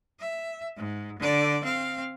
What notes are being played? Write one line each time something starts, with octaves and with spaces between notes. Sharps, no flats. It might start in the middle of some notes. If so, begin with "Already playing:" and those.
E5
G#2
D3 D5
C4 F5